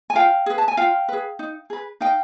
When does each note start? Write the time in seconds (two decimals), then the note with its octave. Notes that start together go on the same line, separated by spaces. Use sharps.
0.10 G#5
0.15 F4 F5 G5
0.46 G#4 B4
0.58 A5
0.68 G#5
0.77 F4 F5 G5
1.09 G#4 B4
1.39 D#4
1.70 G#4 B4
2.00 D#4 F5 G5